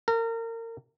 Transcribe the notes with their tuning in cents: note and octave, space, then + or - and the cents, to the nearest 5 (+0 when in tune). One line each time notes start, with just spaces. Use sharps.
A#4 -30